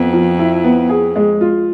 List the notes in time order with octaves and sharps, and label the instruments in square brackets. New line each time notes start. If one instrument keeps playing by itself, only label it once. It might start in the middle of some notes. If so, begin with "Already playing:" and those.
Already playing: [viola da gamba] F2 [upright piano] B3
[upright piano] F3
E4
B3
G#4
G#3
F4